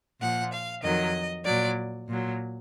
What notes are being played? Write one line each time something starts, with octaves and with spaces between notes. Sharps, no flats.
A#2 F3 F#5
F5
F2 D#3 F#3 D#5
A#2 F#3 D5
A#2 F#3